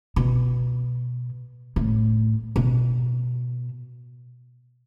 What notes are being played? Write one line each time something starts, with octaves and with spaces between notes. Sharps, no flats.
B2
A2
B2